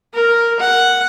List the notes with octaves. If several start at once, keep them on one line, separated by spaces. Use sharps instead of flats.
A#4
F#5